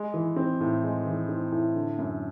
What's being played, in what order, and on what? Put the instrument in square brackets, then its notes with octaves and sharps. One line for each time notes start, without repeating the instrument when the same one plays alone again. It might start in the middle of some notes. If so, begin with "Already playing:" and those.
Already playing: [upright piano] G#3
E3
C4
A2
G#3
E3
C4
A2
D3
F#2